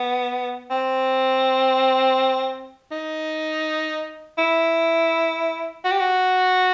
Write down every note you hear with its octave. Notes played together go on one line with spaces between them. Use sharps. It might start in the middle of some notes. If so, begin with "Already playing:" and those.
Already playing: B3
C4
D#4
E4
F#4
G4
F#4